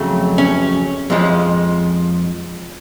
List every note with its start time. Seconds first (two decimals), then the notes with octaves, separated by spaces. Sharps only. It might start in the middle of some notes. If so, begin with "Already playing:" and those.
Already playing: F2 C#3 F#3 A3
0.38 C#4
1.10 F2 F3 G#3